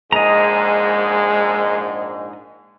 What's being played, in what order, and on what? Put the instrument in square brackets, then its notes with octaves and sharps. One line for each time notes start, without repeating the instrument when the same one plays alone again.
[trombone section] A#1 G#2 [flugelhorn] G#3 [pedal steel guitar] D#5 A#5